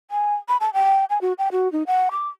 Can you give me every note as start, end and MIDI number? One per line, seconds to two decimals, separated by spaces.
0.11 0.35 80
0.48 0.57 83
0.60 0.70 81
0.74 1.05 79
1.10 1.21 80
1.21 1.33 66
1.38 1.48 79
1.52 1.71 66
1.72 1.83 63
1.87 2.09 78
2.11 2.28 86